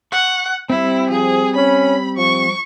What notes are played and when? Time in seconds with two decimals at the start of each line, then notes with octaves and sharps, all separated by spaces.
0.12 F#5 C#6
0.70 G3 C4 E4
1.10 F3 G#4
1.56 C#4 B5
2.17 F3 C#6